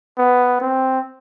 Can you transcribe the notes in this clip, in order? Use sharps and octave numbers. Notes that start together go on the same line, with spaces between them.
B3
C4